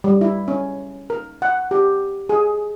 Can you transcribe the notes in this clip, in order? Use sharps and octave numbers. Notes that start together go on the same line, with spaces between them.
G3
E4
C#4
A#4
F#5
G4
G#4